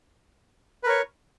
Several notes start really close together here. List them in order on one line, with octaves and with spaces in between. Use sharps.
B4 A#4 C#5